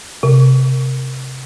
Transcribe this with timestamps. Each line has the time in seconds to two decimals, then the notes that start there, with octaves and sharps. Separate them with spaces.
0.23 C3